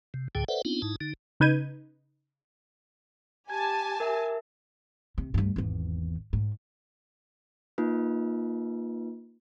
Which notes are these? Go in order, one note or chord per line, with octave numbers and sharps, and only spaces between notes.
C3
D2 A2 D3 G#4 G5
A4 B4 C5 D5 E5 F#5
B3 C4 D4 D#4 F4
G#2 D#4 E4 A5
D3 D#4
C#3 D#4 B4 G6 G#6 D#7
G4 G#5 A5 G#6
A#4 E5
C3
D2 G2
G#1 E2
G#2
A#3 D#4 F4 B4